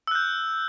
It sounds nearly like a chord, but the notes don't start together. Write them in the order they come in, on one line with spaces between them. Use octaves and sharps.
E6 F#6 G6